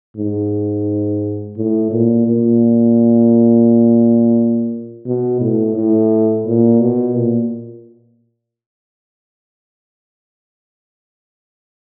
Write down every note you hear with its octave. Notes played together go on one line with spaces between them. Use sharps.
G#2
A2
A#2
A#2
B2
A2
A2
A#2
B2
A#2